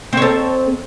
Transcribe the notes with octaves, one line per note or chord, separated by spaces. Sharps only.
C4 A4 C#5